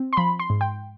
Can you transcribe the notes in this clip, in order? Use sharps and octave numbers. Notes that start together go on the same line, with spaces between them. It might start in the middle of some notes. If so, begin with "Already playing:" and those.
Already playing: C4
C6
F3 B5
C6
G#2
G5